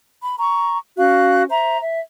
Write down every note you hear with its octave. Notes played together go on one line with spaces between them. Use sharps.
B5
A#5 C#6
C#4 F#4 F5 F#6
C5 E5 A#5
E5